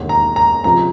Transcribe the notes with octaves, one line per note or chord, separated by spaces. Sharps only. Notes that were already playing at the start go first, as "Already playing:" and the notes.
Already playing: E1 D#2 D3
A#5
A#5
C#2 C3 F3 A#5